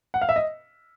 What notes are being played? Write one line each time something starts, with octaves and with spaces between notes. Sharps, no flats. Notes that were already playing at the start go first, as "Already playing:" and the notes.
F#5
F5
E5
D#5